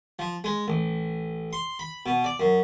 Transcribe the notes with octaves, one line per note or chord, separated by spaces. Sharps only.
F3
G#3
A1
C6
B5
B2
D5
F#2